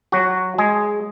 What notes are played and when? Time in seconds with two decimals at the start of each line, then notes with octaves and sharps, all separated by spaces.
0.12 F#3 F#4
0.58 G#3 G#4